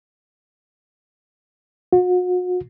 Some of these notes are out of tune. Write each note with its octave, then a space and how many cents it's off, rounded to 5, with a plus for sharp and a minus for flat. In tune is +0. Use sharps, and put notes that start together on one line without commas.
F#4 -40